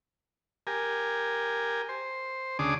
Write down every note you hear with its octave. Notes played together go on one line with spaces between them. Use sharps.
G4 A#4 G#5
C5
D2 C#3 D4 G#4 D6 D#6